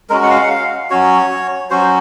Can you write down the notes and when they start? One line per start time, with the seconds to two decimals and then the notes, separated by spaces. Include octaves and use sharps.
0.10 G#3 C#4 F#4 A#4
0.23 F#5
0.30 F5
0.44 F#5
0.50 F5
0.90 F#3 C#4 F#4 C#5
1.70 F#3 C#4 F#4 C5